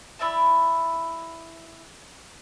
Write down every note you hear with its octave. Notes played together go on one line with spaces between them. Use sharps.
E4 D5 E5 A5